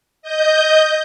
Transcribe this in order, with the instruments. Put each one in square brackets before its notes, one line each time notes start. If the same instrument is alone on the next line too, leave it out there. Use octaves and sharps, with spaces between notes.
[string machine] D#5 G6